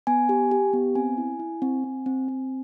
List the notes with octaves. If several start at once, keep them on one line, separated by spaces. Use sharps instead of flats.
B3 G#5
G4
G4
B3
C4 G#5
E4
E4
C4
C4
C4
C4